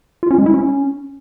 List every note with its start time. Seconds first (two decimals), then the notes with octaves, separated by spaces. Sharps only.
0.23 F4
0.31 C#4
0.38 G#3
0.46 E4
0.54 C#4